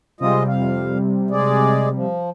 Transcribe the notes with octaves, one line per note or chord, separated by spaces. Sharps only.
C3 G3 G#3 F4 D#5
F2 F5
G#3 G#4 D5
F3